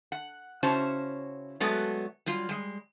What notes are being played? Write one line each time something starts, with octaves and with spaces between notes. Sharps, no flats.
F#5
C#3 C#4 E4 F#4 C5 A5
F#3 G#3 A3 B3 F#4 D5
F#3 G3 F4
G3 G#3